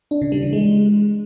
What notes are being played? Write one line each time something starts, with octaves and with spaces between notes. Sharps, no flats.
D4
C#3
G3
E3
G#3